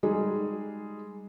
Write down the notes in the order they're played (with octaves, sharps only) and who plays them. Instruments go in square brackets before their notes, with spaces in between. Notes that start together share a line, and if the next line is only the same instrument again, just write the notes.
[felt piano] G3 G#3 D#4 G#4